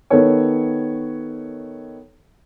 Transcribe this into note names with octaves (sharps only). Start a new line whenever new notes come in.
D#3 B3 A4 C#5